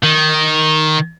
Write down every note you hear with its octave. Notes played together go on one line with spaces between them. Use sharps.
D#3